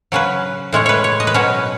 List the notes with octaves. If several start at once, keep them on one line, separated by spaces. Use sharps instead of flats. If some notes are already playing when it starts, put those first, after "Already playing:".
C#3 F#3 C#4 B4
A2 G#3 C#4 C#5
B4 C#5
C#5
D#5
B4
B2 F#3 C#4 C#5